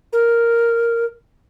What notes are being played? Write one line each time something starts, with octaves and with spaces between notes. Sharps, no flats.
A#4